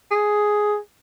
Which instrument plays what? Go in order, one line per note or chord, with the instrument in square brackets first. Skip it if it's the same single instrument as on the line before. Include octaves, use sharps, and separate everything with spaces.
[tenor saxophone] G#4